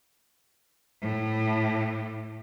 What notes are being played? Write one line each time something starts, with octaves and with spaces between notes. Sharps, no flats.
A2